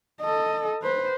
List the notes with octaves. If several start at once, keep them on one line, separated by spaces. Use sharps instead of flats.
A4 D#5
B4 C5